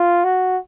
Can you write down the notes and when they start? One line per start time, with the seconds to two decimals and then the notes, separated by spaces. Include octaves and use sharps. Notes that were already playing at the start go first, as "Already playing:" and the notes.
Already playing: F4
0.24 F#4